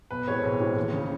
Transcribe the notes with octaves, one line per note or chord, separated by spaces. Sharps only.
B1 B4
A2 E3 G#3 C4 C#5
B1
A2 E3 G#3 C4
D#2
C#3 E3